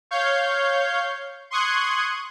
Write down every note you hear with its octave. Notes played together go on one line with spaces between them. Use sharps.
C#5 F5 G6
C6 C#6 D#6 F#6 G#6